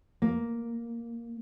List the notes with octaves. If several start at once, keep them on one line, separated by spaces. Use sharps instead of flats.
A#3